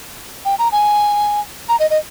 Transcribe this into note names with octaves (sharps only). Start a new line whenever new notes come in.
G5
A#5
G#5
A#5
D#5
D#5